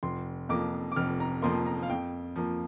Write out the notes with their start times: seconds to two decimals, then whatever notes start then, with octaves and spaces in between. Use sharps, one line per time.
0.03 F1 C6
0.49 F2 F3 A#3 D6
0.92 D6
0.96 F1 F6
1.20 A#5
1.42 F2 F3 A#3 C6
1.66 A#5
1.83 F5
1.90 F2 G5
2.36 F3 A#3